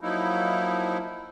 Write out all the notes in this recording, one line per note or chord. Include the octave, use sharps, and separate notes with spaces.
F3 F#3 A#3 D#4 E4